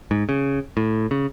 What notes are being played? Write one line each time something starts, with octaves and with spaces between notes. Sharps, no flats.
G#2
C#3
A2
C#3